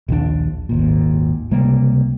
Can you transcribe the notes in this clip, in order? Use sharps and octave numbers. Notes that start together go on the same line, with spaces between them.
A#1 D#2 C#3 D4
G#1 D#2 A#2
C#2 C3 G3 A#3